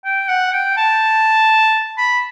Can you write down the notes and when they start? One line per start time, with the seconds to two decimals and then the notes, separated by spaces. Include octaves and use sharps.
0.05 G5
0.28 F#5
0.53 G5
0.77 A5
1.98 B5